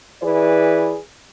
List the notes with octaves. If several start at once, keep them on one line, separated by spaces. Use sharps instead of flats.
E3 E4 G#4 B4 D5